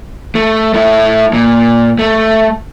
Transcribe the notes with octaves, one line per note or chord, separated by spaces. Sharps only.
A3
A3 E4
A#2
A3